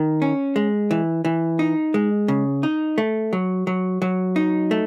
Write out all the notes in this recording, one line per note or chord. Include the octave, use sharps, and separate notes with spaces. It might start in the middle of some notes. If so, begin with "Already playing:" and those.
Already playing: D#3
C#4
G#3
E3
E3
D#4
G#3
C#3
D#4
A3
F#3
F#3
F#3
D#4
A3